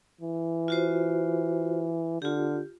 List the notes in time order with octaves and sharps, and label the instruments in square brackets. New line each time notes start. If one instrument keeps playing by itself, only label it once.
[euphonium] E3
[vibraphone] F4 F#4 C5
[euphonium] D3 [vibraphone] F4 G4